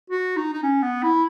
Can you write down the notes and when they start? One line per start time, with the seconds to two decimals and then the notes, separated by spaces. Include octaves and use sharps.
0.10 F#4
0.37 D#4
0.53 D#4
0.63 C#4
0.82 B3
1.03 E4